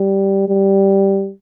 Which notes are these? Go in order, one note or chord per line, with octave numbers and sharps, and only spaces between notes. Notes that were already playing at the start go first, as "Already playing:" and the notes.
Already playing: G3
G3